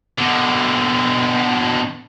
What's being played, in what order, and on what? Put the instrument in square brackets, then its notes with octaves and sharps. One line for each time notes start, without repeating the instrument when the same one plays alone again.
[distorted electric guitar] B2 D3